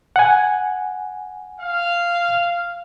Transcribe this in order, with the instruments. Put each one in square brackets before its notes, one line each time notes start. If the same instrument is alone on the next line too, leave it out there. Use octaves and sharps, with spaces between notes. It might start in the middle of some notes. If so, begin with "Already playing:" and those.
[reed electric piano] F#5 G#5
[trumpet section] F5